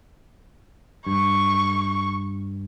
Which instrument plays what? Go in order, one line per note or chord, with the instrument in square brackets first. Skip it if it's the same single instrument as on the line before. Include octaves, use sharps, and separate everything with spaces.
[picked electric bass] G2 [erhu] C#6